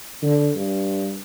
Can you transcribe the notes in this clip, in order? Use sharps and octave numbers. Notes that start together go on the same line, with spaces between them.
D3
G2